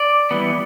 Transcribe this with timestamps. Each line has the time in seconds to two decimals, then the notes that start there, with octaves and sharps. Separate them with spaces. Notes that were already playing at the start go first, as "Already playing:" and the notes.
Already playing: D5
0.31 E3 G3 B3